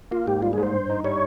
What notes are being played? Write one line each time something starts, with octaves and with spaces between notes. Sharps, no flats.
A#3 F4
G#2 G4
G3 F4
G#4
G#2
C5
G2
D#4
G3 C#5